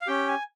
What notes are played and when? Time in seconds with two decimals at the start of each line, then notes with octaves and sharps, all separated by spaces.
0.01 F5
0.07 C#4 G4 G5
0.28 G#5